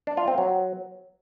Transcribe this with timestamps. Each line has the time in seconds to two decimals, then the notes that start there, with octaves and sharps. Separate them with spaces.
0.07 D4
0.17 F4
0.28 C4
0.38 F#3